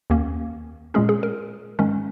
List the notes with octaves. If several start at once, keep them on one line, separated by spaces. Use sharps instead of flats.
D#2 D#3 A#3 C#4
A#2 G#3 C#4 G#4
G#4
A#4
G#2 D#3 G#3 C#4